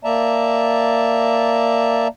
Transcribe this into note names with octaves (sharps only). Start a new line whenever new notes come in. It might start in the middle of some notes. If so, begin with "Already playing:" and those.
A#3 D5 E5 A5 A#5